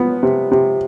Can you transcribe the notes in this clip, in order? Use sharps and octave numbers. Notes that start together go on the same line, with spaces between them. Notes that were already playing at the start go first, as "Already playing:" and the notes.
Already playing: F3 B3
C3
C3